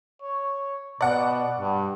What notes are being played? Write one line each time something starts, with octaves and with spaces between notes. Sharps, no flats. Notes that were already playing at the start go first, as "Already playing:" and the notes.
C#5
B2 D5 F#5
G2